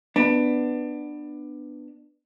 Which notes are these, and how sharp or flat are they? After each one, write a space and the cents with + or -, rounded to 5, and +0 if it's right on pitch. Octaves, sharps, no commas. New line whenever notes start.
B3 +5 D4 +20